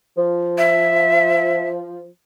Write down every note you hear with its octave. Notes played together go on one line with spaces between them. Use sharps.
F3
E5